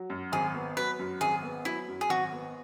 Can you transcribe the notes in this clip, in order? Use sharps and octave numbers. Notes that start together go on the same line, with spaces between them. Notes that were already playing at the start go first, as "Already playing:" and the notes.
Already playing: F#3
F#2
G#1 G#4
B3
F#3 B4
F#2
G#1 G#4
B3
F#3 E4
F#2
G#4
G#1 F#4
B3